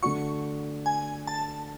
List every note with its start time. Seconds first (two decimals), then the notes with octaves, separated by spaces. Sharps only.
0.02 D3 A3 D4 F#4 C#6
0.86 G#5
1.27 A5